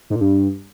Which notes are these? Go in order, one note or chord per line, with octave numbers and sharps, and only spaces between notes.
G#2
A#2
G2